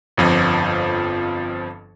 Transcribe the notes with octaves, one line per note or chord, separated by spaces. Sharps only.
G1 F2 F3